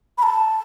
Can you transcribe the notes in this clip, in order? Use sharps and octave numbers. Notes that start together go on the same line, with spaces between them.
B5
A5